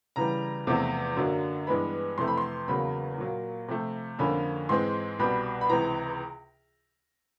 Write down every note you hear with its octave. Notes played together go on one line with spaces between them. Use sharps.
C#3 E3 G3 A#5
E2 C3 F3 A3 C4
F#2 D3 F#3 A#3 D4
G2 E3 G#3 B3 B5
F2 C3 E3 A3 C6
B5
C6
E2 C#3 F#3 A#3 B5
A#2 F#3 A#3
C3 F3 A3
F2 D3 F3 A#3 C#4 B5
G#2 E3 G#3 C4 C6
C2 B2 G3 B5
B5
C#2 C3 E3 A#5